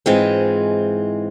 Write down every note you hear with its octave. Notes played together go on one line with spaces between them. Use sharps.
G#2 E3 G#3 C4 F4